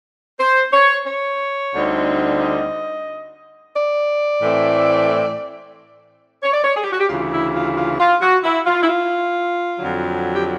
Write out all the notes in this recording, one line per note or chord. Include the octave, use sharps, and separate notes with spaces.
C5
C#5
C#5
D2 D3 G3 C4 D#4
D#5
D5
A2 E3 A3 C4
C#5
D5
C#5
G#4
G4
F#4
G4
D2 C#3 E3 F4
E4
F4
F4
F4
F#4
E4
F4
E4
F4
F2 D3 F#3
G4